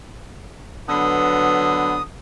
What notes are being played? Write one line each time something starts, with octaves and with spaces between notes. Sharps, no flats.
D3 F#3 B3 D#6